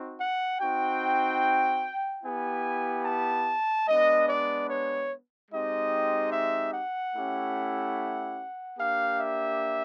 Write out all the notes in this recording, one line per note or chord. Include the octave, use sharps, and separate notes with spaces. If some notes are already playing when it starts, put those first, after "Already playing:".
Already playing: C4 D#4 F#4
F#5
C4 D#4 F#4 G5
B3 E4 G4 G#5
A5
G#3 B3 D4 D#5
D5
C#5
G#3 C4 D#4 G4 D#5
E5
F#5
A3 C#4 E4 G4
A#3 D4 G4 F5
E5